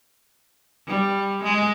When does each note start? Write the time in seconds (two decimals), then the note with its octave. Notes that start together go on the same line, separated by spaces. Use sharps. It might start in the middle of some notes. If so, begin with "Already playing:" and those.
0.88 G3
1.44 G#3